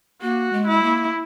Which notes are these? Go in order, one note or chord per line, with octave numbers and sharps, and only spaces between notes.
A#3 F#4
G#3
E4
A#3